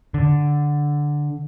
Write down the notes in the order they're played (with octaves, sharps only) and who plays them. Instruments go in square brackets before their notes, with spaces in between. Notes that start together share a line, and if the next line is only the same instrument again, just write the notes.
[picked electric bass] D3